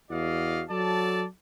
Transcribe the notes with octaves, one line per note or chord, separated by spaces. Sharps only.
E2 F#4 D5 D#5 F5
F#3 A4 D5 A5